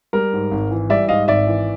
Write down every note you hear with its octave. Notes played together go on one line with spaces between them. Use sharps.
G3 A#4
G#2
G#1
E3
G3 D5 E5
G#2 D#5 F5
G#1 D5 E5
E3